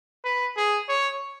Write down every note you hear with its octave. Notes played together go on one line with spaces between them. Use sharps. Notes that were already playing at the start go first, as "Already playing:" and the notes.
B4
G#4
C#5